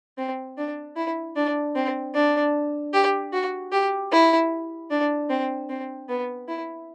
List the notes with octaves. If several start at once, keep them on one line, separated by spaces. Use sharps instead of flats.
C4
D4
E4
D4
C4
D4
G4
F#4
G4
E4
D4
C4
C4
B3
E4